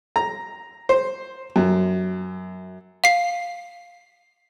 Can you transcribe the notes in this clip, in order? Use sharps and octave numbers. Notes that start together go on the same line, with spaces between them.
A#5
C5
F#2
F5 C7